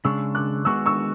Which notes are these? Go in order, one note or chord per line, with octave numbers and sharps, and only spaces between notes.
C#3 G#3 D4 C#6 E6
D6 F#6
G#3 B3 F#4 C#6 E6
C#6 E6